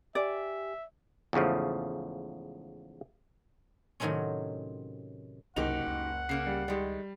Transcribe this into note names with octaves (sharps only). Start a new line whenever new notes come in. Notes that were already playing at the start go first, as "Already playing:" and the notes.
G4 D5 E5 G#5
E2 G#2 C#3 F3 A3
A2 C3 D#3 F#3 C4 C#4
F#1 C2 D#4 F#4 G4 F#5 F7
C#2
C#3 A#3 C#4 C7
G3
D#3 G3 G#3